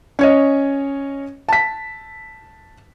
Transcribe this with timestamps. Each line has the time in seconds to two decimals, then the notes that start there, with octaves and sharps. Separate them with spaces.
0.19 C#4 C#5 D#5
1.49 A5 B6